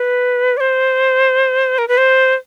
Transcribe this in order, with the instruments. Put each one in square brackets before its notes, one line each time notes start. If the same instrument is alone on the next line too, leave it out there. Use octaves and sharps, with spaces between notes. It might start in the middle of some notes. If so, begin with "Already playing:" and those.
Already playing: [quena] B4
D5
C5
A#4
B4
C5